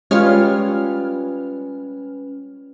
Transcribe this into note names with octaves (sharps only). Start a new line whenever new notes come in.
G3 G#3 C#4 F4 B4 C#5 F6